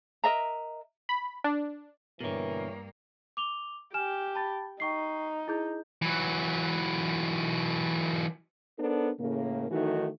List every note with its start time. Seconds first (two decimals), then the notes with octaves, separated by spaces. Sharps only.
0.24 A#4 D#5 E5 A#5
1.09 B5
1.44 D4
2.20 G2 B2 D3 E3 A#3 A#4 C#5
3.37 D6 F7 G7
3.94 G4 G#5 F6 E7
4.35 A5 B5 A6
4.80 D#4 G5 C#6 C7
5.48 E4 G#4 G6
6.02 E3 F#3
8.79 B3 D4 D#4 A4 A#4 C5
9.20 A2 C#3 A#3
9.71 D#3 E3 F#3 A3 D#4 F#4